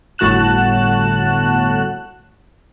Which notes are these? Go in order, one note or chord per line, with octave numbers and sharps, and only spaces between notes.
G1 A2 F#4 A5 F#6 E7